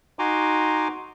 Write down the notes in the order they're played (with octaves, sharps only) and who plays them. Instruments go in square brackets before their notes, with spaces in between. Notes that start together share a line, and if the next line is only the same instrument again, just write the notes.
[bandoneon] D#4 F#4 G#5 A#5 C6 D6